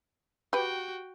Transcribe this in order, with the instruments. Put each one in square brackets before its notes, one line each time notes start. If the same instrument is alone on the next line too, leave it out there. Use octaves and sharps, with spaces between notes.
[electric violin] F#4 G5 [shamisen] G4 B4